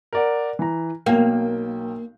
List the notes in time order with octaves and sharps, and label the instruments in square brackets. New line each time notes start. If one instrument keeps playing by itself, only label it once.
[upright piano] A#4 D5 F#5
E3 A#5
[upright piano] B1 G5 [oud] A#3